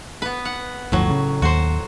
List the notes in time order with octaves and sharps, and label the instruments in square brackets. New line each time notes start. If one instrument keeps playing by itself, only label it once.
[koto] B3 B4
F#5
[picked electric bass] G1 D2 F3 [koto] A2 F#3
[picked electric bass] C#3
[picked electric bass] D#2 [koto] F#4 C5